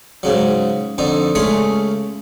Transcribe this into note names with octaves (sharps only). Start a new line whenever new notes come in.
G#2 C#3 F#3
F2 D3 D#4
C#2 A3 C#4 G#4 C#5 C6